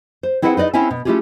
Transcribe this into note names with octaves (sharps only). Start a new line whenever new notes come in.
C5
C4 E4 G#4 B4 E5 F#5
D#4 B4 D5 D#5
C4 C#4 E4 E5 F5 G#5
B2
A3 C#4 E4 F4 G4 G#4